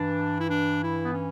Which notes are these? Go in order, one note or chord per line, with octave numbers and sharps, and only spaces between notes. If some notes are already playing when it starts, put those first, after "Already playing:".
Already playing: G2 E3 D4
E4
D4
E4
B3
C#4